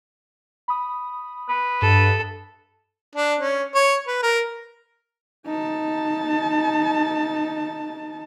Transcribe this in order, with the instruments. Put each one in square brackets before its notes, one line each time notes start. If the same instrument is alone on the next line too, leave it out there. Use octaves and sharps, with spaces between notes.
[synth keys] B5 D#6
[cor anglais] B4
[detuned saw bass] G2 [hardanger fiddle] A4
[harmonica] D4
C#4
C#5
B4
A#4
[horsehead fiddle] D#4 A5